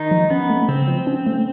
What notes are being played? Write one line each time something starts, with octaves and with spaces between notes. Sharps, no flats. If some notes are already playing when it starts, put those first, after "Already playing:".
Already playing: D#3 D#4
F3
B3 C#4
A3
C#3 C4
F3
C#4
A3